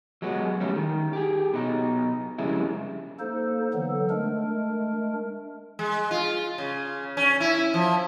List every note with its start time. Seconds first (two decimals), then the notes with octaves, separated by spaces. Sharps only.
0.22 F#3 G#3 B3
0.60 G3 A3 C#4
0.76 D#3
1.13 G4 G#4
1.54 B2 D#4
2.38 F2 C#3 G3 G#3 E4
3.19 A#3 D#4 A4 C5
3.74 D3 E3 F#3 B3 A4
4.10 G#3 A3 D4 A#4
5.79 G#3
6.11 F4
6.58 C#3
7.17 C#4
7.40 E4
7.74 F3